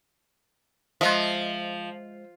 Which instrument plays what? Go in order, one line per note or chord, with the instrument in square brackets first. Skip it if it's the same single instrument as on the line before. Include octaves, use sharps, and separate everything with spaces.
[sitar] F3 [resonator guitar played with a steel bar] G#3 D#5 E5